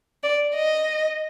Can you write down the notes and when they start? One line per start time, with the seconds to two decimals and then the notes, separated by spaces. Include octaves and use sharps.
0.23 D5
0.55 D#5